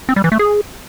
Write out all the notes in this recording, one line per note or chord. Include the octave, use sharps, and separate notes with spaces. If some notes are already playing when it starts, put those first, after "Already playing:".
C4
G3
E3
A3
G#4